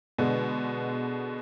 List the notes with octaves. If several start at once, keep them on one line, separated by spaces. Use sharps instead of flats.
B2 D3 G#3 B3